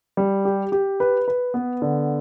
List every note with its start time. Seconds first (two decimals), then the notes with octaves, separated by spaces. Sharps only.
0.17 G3
0.45 G4
0.72 G4
1.00 B4
1.28 B4
1.54 B3
1.82 D3